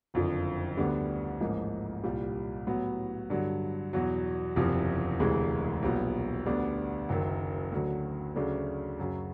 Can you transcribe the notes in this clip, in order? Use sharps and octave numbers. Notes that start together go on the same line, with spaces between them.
F#1 F2 D3 F3
D2 D3 G3 B3 D4
A1 G#2 F3 A#3 D#4
C2 A#2 G3
A2 F#3 B3
G2 D3 F#3
E2 B2 F#3
F#1 E2 C3 F3
E1 D2 C3 E3 G#3
B1 A#2 G3 B3
D2 D3 G3 B3 D4
F#1 F#2 D#3
D2 D3 F#3
D2 C#3 F#3 A3 D4
F#2 C#3 F#3